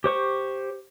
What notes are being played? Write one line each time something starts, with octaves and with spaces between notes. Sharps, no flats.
G4 C5 C#6